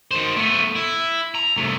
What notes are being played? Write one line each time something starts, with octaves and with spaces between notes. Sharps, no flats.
D#3 C5
A3 B3
E4
A#5
C2 A3